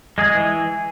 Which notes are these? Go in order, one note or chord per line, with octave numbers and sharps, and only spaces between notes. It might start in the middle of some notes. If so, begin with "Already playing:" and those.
G#3 G#4
E3